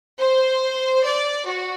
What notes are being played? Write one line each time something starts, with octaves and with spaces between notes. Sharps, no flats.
C5
D5
F#4